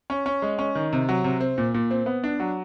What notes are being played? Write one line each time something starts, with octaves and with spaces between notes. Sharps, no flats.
C#4
C#4
G#3
C#4
D#3
C3
F#3
C3
C4
A#2
A#2
C4
B3
D4
F#3